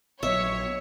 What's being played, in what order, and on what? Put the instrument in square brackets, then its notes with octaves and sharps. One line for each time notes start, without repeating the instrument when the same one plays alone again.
[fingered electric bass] A#1 F#3 [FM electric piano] B3 D#5 [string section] C#5 [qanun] E5